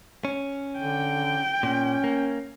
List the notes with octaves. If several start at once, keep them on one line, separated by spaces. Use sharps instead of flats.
C#4
D3 G5
A#2 C#4
A#3